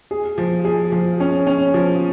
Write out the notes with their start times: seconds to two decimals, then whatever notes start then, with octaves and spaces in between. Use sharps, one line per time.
0.11 G#4
0.38 F3
0.65 G#4
0.92 F3
1.20 C#4
1.47 C#4
1.74 F3